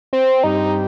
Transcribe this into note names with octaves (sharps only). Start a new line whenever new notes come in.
C4
G2 G3 C4 D#4 G4